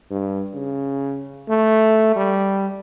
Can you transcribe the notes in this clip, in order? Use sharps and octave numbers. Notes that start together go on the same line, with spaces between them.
G2
C#3
A3
G3